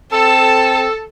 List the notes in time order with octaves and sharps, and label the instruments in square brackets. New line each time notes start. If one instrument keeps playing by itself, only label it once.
[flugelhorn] C4 [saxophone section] A4 [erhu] A5